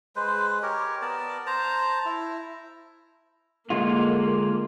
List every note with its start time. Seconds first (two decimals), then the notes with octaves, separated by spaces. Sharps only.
0.16 G#3 B4 C5
0.63 G4 A#4 C#5
1.02 B3 A#4 D5 A5
1.46 C5 A5 A#5
2.05 E4
3.70 D3 G#3 A#3 F4